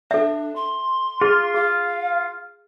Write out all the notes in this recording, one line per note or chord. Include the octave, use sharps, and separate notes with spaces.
D4 A4 E5
C6
F4 G#4
G#4 F5